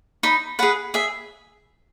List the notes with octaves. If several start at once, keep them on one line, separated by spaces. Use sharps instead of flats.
D#4 B5
G#4 B4 F#5
G#4 E5